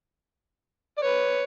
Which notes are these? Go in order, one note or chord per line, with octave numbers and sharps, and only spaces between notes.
D5
B4 C#5